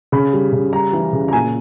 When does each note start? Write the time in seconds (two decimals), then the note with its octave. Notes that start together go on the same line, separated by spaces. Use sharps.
0.12 C#3 B5
0.33 G3
0.52 C#3
0.73 G3 A#5
0.93 E3
1.13 C#3
1.28 A#5
1.33 A#2 G#5